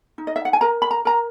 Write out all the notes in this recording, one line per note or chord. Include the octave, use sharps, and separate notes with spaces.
D#4
D#5
E5
F#5
G#5
A#4 A#5
B5
A#5
A#4 A#5